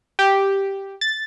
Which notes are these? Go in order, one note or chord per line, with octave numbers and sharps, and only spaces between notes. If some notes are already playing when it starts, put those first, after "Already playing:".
G4
A6